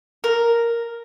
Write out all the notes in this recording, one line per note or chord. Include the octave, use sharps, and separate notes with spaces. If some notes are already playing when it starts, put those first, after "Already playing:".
A#4